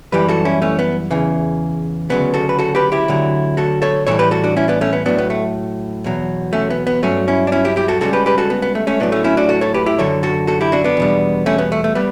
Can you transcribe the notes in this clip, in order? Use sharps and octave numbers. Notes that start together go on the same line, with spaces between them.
F#2 E3 G3 G4 B4
F#4 A4
C#4 E4
A3 C#4
B3
E2 C#3 E3
D2 C#3 F#3 B3
F#4 A4
B4
F#4 A4
G4 B4
E4 G4
D2 D3 F#3
F#4 A4
A4 C#5
A2 E3 G3 A4 C#5
G4 B4
F#4 A4
D4 F#4
C#4 E4
B3 D4
A3 C#4
B3
A2 F#3 B3 D4
B3
A3
E2 B2 F#3
A3 C#4
B3
B3
G2 F#3 A3 C#4
C#4 E4
D4
C#4 E4
E4 G4
E4 G4
F#4 A4
C#2 C#3 G3 F#4 A4
G4 B4
G4 B4
F#4 A4
B3
B3
A3
A3 C#4
A2 F#3 B3 D4
A3 C#4
C#4 E4
D4 F#4
F#4 A4
A4 C#5
G4 B4
E4 G4
F#2 D3 F#3 A4 C#5
F#4 A4
F#4 A4
E4 G4
D4 F#4
B3 D4
E2 B2 G3
A3 C#4
B3
A3
A3
G3 B3